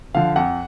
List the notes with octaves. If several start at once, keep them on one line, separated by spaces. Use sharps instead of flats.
D3 F3 F5
F2 F#5